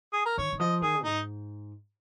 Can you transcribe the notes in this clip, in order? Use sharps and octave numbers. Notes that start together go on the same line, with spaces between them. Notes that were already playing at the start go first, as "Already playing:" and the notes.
G#4
A#4
D#3 C#5
D#3
F3 D#5
D#3 G#4
G#2 D#4